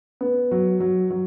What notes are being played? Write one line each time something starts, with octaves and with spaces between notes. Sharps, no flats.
B3
F#3
F#3
F#3